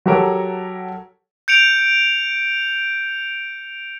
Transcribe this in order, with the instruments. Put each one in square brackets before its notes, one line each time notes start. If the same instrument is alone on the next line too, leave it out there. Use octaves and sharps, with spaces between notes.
[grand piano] F#3 F#4 G4 A4 A#4 C#5
[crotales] G6 C#7 D7 F7